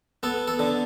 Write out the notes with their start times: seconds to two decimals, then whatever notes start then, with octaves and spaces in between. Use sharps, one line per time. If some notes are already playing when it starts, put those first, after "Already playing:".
0.23 B3 A4
0.47 A4
0.59 D3